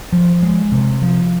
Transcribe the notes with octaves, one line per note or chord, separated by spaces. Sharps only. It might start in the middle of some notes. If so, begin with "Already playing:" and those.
F3
G#3
C3
F3